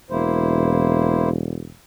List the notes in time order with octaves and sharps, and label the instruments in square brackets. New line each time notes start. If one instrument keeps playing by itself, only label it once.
[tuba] E1 [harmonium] A#3 E4 C5